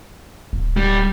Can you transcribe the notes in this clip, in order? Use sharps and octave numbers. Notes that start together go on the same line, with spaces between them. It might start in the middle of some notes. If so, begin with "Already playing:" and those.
D1
G3